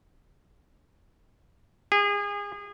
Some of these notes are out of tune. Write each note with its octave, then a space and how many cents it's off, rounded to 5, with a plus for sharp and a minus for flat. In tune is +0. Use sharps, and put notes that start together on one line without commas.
G#4 -30